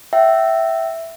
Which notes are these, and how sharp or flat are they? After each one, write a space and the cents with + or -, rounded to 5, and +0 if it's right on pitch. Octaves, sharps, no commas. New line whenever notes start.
E5 +0 G5 -30